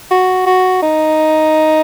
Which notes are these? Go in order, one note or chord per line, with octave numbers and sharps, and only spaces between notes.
F#4
F#4
D#4